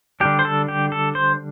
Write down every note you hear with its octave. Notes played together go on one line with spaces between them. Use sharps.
D3 G3 D4 G4
C5
A4
G4
A4
C5